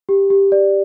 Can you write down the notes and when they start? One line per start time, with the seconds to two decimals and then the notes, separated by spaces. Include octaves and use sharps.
0.09 G4
0.30 G4
0.52 D5